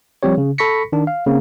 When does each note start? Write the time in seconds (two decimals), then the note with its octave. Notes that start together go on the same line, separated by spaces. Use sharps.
0.23 F3 G3 C4 G4 C#5
0.38 C#3
0.58 A4 B5 C#6 A#6 B6 C#7
0.92 D#3 D4
1.07 F5
1.27 C#3 A#3 C4